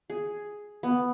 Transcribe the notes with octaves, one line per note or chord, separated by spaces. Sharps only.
G#4
B3